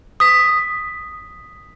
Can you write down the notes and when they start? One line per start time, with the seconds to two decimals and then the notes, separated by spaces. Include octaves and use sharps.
0.20 D#6 B6